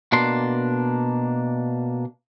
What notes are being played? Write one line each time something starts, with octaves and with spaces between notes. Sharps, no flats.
B2 A#3 D4 C6